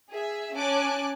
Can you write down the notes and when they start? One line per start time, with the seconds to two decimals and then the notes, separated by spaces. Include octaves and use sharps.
0.11 G#4 E5
0.54 C#4 G#5 A5 D6 F#6